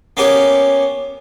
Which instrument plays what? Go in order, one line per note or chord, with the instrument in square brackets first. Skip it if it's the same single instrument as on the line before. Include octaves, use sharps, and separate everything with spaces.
[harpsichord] A#3 B3 C#4 G4